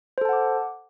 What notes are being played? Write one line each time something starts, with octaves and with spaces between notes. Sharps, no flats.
A4 C5 F#5 A5 D6